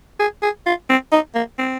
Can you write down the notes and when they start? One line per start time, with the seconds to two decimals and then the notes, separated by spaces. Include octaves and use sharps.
0.20 G#4
0.43 G#4
0.66 F4
0.90 C4
1.12 D#4
1.35 A#3
1.58 C4